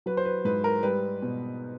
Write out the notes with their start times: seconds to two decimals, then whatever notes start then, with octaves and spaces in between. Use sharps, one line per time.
0.06 F#3 B4
0.17 C5
0.25 B4
0.45 G#2 B4
0.64 A#4
0.83 G3 B4
1.22 B2